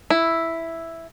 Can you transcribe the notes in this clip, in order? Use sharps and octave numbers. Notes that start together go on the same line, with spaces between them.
E4